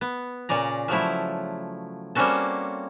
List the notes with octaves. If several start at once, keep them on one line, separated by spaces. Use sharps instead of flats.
B3
A#2 C#3 D5 A#5
F3 F#3 A3 E4
G3 A#3 C4 C#4 F#4 A4